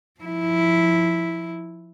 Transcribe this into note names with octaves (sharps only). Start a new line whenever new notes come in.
F3 E4